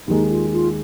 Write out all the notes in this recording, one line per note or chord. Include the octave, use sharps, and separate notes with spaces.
D#2 D#3 G#3 D#4
F4
F4